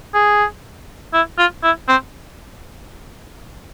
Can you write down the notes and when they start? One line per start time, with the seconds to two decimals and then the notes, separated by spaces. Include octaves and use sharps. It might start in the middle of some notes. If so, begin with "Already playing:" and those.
0.14 G#4
1.14 E4
1.38 F4
1.64 E4
1.88 C4